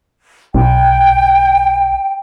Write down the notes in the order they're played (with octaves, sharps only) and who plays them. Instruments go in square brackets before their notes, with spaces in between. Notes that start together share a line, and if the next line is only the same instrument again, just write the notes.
[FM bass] B1 [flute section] G5